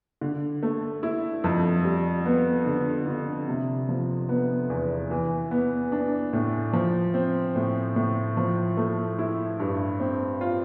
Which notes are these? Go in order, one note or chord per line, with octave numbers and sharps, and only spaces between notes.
D3
A3
E4
F2
G3
B3
D3
D3
C3
F3
B3
E2
E3
B3
D4
A2
F3
C4
A2
A2
F3
A3
E4
G2
C4
F4